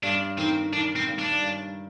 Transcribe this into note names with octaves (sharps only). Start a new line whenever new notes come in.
G2 D4
D#3 C4
D#3 D4
C4
G2
D4
G2